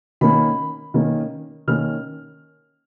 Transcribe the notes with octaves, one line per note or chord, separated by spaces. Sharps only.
D#3 A#3 C#4 B5
D#3 A#3 C#4
D#3 A#3 C#4 F6